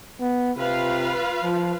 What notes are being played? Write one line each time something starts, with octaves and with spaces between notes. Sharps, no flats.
B3
C3 F4 B4 F5
F3